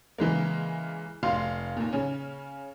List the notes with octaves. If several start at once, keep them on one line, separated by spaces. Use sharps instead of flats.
C#3 E3 G#3 A#3
F1 F5 C6
D#2 A#2
C#3 C#4